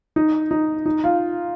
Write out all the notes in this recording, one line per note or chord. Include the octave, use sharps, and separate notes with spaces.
D#4
D#4
D#4
F4